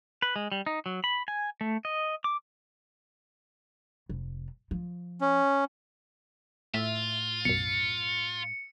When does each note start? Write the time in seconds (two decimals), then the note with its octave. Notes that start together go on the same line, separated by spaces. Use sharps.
0.22 B4
0.36 G#3
0.52 G3
0.66 D#4
0.86 F#3
1.04 B5
1.28 G#5
1.61 A3
1.85 D#5
2.24 D6
4.09 F1
4.71 F3
5.21 C#4
6.74 A2 F4 E5
7.45 B1 F#2 C#7